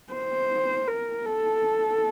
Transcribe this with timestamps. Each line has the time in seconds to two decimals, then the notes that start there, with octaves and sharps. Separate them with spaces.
0.13 C5
0.88 A#4
1.25 A4